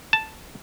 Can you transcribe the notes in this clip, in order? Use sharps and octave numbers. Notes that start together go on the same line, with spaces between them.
A5